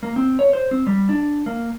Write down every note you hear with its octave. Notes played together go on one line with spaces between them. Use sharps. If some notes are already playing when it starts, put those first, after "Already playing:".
A#3
C4
C#5
C5
C4
G3
D4
A#3